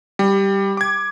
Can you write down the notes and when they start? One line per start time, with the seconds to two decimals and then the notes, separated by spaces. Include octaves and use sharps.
0.19 G3
0.77 D6 G#6